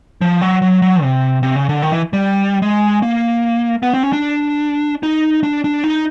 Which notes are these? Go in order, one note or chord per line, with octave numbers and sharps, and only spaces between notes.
F3
F#3
F#3
F#3
C3
C3
C#3
D3
D#3
E3
G3
G#3
A#3
B3
C4
C#4
D4
D#4
D4
D4
D#4